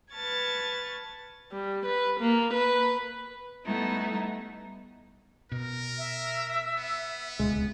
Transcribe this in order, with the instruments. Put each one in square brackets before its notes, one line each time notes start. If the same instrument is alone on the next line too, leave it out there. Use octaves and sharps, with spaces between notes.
[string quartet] B4 A5 C#6 F6 G#6 A6
[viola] G3
B4
A#3
B4
[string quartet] G3 A3 B3 D#4 E4
[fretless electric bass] B2 [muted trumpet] A#4
[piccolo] E5
[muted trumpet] B3
[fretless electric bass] D1 C#2 B2 [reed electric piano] G#3